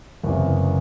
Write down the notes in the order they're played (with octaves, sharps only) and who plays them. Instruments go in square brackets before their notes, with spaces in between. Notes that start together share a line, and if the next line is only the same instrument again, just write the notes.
[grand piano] F#1 E2 C3